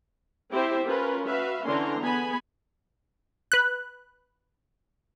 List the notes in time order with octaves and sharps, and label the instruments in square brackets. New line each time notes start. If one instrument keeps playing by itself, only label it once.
[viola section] C4 E4 G4 C5 E5
C#4 F4 A#4 B4
F#4 B4 E5 F5
D3 E3 C#4 D4 A#5 C6
B3 G#4 G#5 B5
[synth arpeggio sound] B4 F#6